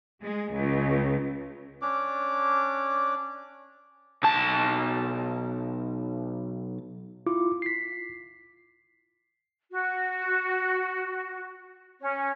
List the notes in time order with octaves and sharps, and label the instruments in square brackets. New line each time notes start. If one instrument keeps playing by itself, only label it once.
[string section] G#3
C#2
[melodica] C#4 D4 D6
[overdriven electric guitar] B1 A5
[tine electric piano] E4 F4 D6
B6 C7
[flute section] F#4
C#4